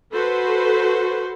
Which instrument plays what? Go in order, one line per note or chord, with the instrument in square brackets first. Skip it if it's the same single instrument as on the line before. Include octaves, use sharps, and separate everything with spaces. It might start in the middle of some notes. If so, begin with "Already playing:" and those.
[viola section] F#4 A4 B4 C5